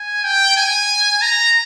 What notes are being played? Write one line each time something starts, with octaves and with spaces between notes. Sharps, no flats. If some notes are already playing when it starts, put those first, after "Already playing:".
Already playing: G#5
G5
G#5
A#5